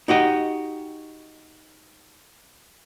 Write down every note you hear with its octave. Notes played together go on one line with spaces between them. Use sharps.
D#4 F#4 G4 D#5